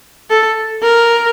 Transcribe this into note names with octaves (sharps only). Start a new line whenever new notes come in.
A4
A#4